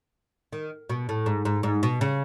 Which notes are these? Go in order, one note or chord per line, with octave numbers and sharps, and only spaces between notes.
D#3
B2
A2
G#2
G#2
G#2
B2
C#3